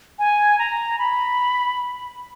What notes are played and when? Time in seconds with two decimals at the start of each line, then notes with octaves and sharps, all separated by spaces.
0.19 G#5
0.59 A#5
0.99 B5